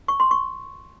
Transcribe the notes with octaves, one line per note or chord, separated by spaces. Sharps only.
C#6
C6
C#6